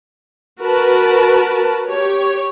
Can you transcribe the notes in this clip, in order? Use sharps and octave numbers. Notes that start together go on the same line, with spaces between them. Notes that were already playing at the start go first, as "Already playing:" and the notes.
F#4 A#4 B4 A5
G4 C#5